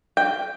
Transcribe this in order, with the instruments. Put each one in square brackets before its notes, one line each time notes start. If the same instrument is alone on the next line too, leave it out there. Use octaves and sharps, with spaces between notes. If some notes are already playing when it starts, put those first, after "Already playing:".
[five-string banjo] G5